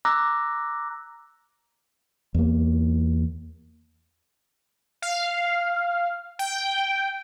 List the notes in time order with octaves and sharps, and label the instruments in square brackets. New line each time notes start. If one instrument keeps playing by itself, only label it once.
[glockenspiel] A#5 D6 E6 F#6 A#6
[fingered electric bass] E2 A#3
[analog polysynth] F5
G5